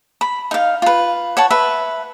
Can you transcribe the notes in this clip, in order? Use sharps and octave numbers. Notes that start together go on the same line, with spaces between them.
B5
D#4 F5
F4 B4
C#5 F#5 A5
B4 E5